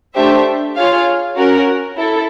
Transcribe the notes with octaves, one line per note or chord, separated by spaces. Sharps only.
A3 D4 G4 C5 E5
F4 G#4 C#5 F5
C#4 F#4 A#4
E4 A4